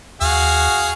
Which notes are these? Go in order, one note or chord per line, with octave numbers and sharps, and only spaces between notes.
D#2 F#4 G#4 F5